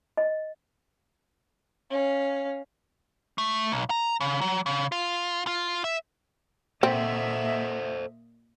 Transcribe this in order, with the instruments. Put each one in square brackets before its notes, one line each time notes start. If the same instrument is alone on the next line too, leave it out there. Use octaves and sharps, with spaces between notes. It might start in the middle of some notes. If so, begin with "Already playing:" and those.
[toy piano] D#5
[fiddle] C#4 F5
[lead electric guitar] A3
B1
A#5
C#3
F#3
C#3
F4
F4
E5
[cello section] A#2 D#5 E5 [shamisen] C4 [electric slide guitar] A4 C5 F#5